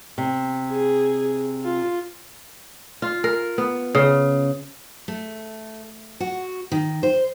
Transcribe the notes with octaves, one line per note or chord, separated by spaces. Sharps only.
C3
G#4
F4
F4
A#4
B3
C#3
A3
F#4
D#3
C5